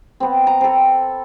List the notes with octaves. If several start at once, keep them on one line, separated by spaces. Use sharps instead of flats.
B3 C4
A#5
C4 A4